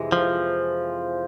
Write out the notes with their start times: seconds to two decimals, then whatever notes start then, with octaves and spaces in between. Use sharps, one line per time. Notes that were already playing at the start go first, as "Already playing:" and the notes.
Already playing: F2 C3 E3 G#3
0.12 F3